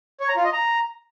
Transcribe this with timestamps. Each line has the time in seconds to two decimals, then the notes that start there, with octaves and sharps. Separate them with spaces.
0.20 C#5
0.28 A#5
0.36 F4
0.45 D#5
0.53 A#5